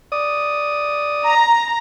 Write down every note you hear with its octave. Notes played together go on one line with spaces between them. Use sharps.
D5 D#6
A#5